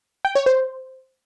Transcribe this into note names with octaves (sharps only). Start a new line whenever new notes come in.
G5
C#5
C5